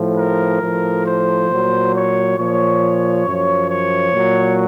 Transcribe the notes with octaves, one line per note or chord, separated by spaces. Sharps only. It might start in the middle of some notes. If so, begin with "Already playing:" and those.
Already playing: A2 F3
A#4
A2 F3
C5
A#2 F#3
C#5
A#2 F3 C#5
F#2 F3
C#5
A#2 F#3